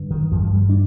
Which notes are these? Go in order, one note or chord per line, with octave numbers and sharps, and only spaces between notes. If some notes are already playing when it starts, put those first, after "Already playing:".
Already playing: G2 D3
D#3
G2 F3
F3
G3
D4